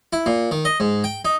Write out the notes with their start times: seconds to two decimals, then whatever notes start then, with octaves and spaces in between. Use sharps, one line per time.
0.13 E4
0.26 A#2
0.51 D#3
0.65 D#5
0.80 G#2
1.04 G5
1.25 D#4